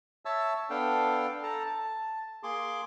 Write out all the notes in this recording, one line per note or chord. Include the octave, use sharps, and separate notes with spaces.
C#5 E5 A5 E6
B3 D4 A4 F5 G5
A4 A5 A#5
A5
A#3 G#4 C6 D6